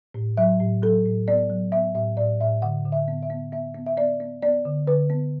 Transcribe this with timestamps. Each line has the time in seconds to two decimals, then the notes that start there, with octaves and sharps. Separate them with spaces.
0.14 A2
0.37 F#3 E5
0.60 A2
0.82 F#3 A4
1.05 A2
1.28 B3 D5
1.50 F#3
1.72 B3 E5
1.95 A2 E5
2.17 A2 D5
2.40 A2 E5
2.62 D3 F#5
2.85 D3
2.92 E5
3.08 B3
3.23 E5
3.30 B3
3.52 B3 E5
3.75 B3
3.86 E5
3.97 B3 D5
4.20 B3
4.42 B3 D5
4.65 D3
4.87 D3 B4
5.10 B3